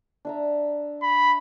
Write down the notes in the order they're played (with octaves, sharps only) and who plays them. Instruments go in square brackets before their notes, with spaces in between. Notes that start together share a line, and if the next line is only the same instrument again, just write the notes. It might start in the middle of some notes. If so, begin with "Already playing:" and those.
[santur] D4 E5 A#5
[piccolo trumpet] B5